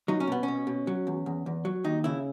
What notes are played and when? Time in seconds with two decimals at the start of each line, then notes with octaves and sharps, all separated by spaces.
0.08 F#3 D#4
0.20 C#4
0.27 B2 B3
0.43 C#4
0.48 B2
0.67 B2
0.87 F#3
1.07 E2
1.26 E2
1.46 E2
1.65 F#3
1.84 D#2 D#4
2.04 C#3 E4